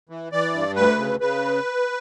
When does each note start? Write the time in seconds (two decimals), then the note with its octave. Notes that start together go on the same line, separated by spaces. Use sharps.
0.09 E3
0.32 E3 D5
0.54 G2
0.76 D2 B4
0.98 C#3
1.20 C#3 B4